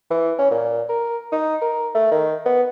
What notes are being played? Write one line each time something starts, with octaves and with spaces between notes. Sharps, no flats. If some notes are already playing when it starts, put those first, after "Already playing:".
E3
C#4
A#2
A#4
D#4
A#4
A3
D#3
B3